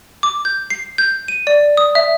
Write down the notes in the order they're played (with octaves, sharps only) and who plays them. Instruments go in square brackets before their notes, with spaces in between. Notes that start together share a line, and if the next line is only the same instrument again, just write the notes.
[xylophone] D6
G6
C7
G6
D#7
D5
D#6
E5